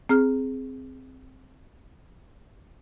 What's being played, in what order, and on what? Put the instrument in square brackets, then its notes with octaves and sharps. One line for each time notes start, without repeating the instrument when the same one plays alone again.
[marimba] C4 G#4 F6